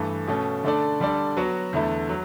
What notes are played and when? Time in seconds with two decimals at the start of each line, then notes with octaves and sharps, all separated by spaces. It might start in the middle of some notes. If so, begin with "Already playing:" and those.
Already playing: G2 E3 A3
0.27 B2 A3 C#4
0.64 D3 A3 D4 A4 D5
1.00 D3 G3 D4 A4 D5
1.37 F#3 B3 F#4
1.73 E2 D3 A3 E4
2.09 F#3